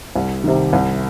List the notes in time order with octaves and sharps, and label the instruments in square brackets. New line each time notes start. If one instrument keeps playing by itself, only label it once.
[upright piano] C2
C3 D#3
C2